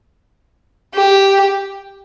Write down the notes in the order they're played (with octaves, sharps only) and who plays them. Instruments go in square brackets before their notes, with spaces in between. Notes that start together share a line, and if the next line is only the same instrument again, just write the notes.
[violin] G4